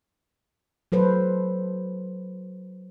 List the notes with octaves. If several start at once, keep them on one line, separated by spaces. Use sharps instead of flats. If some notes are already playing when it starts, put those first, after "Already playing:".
F#3 A4 B4 C5